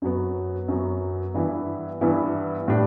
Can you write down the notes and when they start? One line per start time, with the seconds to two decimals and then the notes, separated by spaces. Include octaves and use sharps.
0.02 F#2 F#3 B3
0.68 F#2 F#3 B3
1.34 G2 E3 B3 E4
2.01 G2 E3 B3 E4
2.68 A2 G3 D4